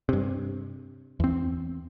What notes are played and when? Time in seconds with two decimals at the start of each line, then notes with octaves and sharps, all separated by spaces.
0.09 G2 C3
1.20 E2 C4